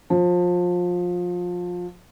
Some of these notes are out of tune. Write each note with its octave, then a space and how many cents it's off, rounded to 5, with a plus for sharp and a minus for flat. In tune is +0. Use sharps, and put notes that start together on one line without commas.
F3 +25